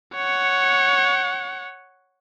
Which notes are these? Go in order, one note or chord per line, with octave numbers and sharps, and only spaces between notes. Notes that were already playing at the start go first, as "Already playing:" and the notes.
C#5 F#5